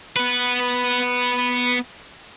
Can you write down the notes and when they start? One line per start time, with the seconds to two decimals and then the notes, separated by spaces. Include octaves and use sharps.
0.16 B3 B4